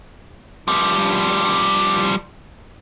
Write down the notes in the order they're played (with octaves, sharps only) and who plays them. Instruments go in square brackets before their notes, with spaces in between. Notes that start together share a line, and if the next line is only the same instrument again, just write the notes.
[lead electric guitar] F3 G3